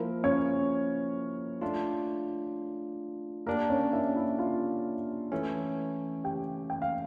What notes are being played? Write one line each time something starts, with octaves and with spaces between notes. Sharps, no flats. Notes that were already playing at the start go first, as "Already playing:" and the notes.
Already playing: F3 A#3 E4 A#4
C#4 C#5
A3 D4 F4
A#3 D4 G4 A#4
C#4 C#5
E4 E5
E4 E5
F4 F5
E3 A3 C#4
G4 G5
G5
F5